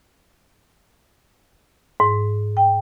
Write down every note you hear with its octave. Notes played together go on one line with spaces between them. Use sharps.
G#2
G5